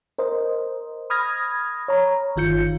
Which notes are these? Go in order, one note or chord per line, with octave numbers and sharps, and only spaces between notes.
A#4 C5 D#5
B5 D#6 F6 G#6 A#6
C#5 A#5
G1 D#3 F4 G6 C#7